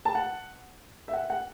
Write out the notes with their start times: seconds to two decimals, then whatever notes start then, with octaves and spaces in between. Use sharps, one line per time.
0.05 A5
0.15 F#5
1.08 E5
1.13 F#5
1.30 F#5